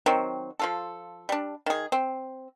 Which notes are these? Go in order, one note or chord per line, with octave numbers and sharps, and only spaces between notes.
D#3 F#3 C4
F3 F4 A4
G3 D4
D#3 G#4
C4